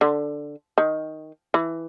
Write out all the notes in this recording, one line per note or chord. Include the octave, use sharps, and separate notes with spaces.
D3
D#3
E3